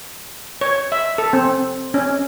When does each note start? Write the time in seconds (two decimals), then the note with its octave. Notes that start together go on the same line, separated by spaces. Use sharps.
0.61 C#5
0.92 E5
1.18 A4
1.33 C4
1.94 C#4